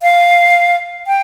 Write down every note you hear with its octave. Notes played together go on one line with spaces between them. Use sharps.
F5
G5